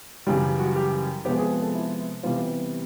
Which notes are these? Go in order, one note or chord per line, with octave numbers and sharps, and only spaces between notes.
F#2 C#3 E3 G3 G4
F#4
G4
C3 F3 G#3 B3 G4
G#4
A4
E4
C3 E3 G3 B3 F4